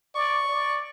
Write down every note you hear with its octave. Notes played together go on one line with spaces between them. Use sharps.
D5 C#6
D5